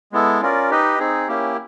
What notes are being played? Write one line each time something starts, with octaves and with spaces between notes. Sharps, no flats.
G#3 B3 E4 A4
C#4 F4 A#4 D5
D#4 G4 B4 D#5
C4 D#4 G#4
A#3 C#4 E4 G4